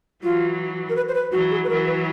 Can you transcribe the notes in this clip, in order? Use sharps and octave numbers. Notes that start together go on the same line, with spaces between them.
E3 F#3 F4
A#4
B4
C5
B4
E3 F#3 F#4
G#4
B4
E3 F#3 A#4
B4